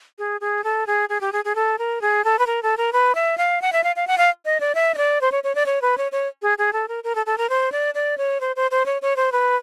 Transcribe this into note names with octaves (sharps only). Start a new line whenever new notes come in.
G#4
G#4
A4
G#4
G#4
G4
G#4
G#4
A4
A#4
G#4
A4
B4
A#4
A4
A#4
B4
E5
F5
F#5
E5
F5
F5
F#5
F5
D#5
D5
E5
D#5
D5
C5
C#5
C#5
D5
C#5
B4
C#5
C#5
G#4
G#4
A4
A#4
A#4
A4
A4
A#4
C5
D5
D5
C#5
C5
C5
C5
C#5
C#5
C5
B4